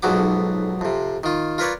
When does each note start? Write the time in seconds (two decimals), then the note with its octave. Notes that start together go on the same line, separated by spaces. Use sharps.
0.02 B1 F2 G#2 F#3 B3 D6
0.81 F2 C3
1.24 D#3 F4
1.58 F4 A#4 B4 C#5 D5